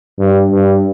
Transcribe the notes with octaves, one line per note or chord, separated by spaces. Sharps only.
G2
G2